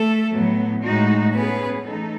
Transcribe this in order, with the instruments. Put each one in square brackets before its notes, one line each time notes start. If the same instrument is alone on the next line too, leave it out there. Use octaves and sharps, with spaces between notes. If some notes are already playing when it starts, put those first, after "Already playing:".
Already playing: [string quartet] A3 A4
[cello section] A2 F#3 B3
A2 G#3 D#4 F#4
[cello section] A3 C#4 G#4 [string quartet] B3 B4
[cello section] E3 A3 D#4 A4